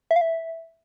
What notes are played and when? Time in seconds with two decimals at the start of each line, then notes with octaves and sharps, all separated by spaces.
0.11 E5
0.16 F5
0.21 E5